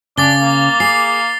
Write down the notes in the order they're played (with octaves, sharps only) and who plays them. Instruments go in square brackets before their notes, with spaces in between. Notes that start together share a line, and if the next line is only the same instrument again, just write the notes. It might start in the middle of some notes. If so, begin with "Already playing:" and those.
[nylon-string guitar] C#3 [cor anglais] D4 [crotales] D6 A6 G7
[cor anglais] A#3
[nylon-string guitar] G#4 [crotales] C7